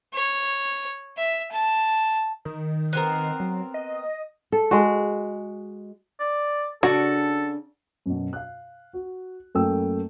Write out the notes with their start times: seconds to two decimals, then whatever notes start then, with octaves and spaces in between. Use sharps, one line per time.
0.14 C#5
1.17 E5
1.52 A5
2.45 D#3
2.93 B3 C4 A#4
3.40 F#3
3.74 D#5
4.52 A4
4.71 G#3 F#4
6.19 D5
6.83 C#3 D4 F#4 A4
8.06 F#2 B2
8.33 F5 F#6
8.93 F#4
9.55 F#2 A3 A#3 G5 E6